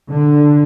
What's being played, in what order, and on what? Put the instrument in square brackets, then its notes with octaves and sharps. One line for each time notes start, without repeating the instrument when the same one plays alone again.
[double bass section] D3